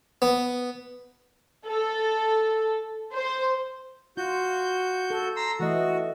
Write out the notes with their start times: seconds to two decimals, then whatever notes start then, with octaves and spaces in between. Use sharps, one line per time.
0.22 B3
1.65 A4
3.13 C5
4.17 F4 F#4 G6
5.10 A4
5.36 A#5 C6 E6
5.60 E3 A3 F#4 D#5